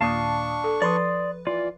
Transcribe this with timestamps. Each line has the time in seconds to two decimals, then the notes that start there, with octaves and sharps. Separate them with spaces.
0.01 D#2 A#2 D4 F5 A5 C#6 D#6
0.64 A4
0.82 F3 B4 D5 C6 D#6
1.47 E3 F4 D5